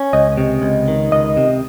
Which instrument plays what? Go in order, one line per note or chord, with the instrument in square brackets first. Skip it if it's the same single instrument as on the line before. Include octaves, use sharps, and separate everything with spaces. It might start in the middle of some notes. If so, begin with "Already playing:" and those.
Already playing: [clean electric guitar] C#4
[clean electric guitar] C#2 [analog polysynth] D#5
[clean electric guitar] C3
C#2
D#3
[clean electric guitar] C#2 [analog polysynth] D#5
[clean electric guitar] C3